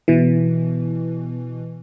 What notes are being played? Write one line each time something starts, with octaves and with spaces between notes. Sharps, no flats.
B2 E3